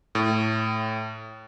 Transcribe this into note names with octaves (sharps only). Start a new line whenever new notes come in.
A2